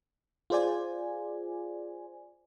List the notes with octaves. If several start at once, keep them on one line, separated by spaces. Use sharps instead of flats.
F4 G#4 C5 D5 G#5